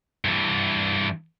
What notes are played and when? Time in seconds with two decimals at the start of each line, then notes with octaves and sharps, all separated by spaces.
0.25 G2 E3